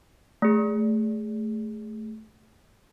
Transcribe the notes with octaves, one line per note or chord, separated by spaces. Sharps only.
A3 G#4